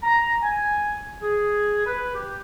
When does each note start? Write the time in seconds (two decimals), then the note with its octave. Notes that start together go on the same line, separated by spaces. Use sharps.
0.03 A#5
0.42 G#5
1.22 G#4
1.85 B4
2.15 G4